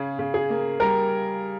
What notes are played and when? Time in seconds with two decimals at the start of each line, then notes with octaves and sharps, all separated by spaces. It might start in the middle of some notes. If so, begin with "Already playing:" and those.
Already playing: C#3 G#4
0.19 C#3
0.34 G#4
0.50 A#3
0.80 G3 A#4